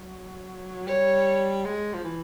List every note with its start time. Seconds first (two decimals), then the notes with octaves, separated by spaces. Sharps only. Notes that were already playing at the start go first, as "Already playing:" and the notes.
Already playing: F#3
0.87 G3 C#5
1.65 G#3
1.93 F3
2.04 E3